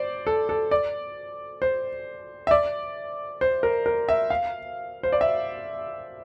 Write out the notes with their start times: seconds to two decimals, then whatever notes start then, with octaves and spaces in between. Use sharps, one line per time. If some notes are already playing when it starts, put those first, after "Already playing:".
Already playing: C5 D5
0.27 A4
0.49 A4
0.71 D5
1.62 C5
2.47 E5
2.51 D5
3.41 C5
3.63 A#4
3.86 A#4
4.09 E5
4.30 F5
5.03 C5
5.12 D5
5.21 E5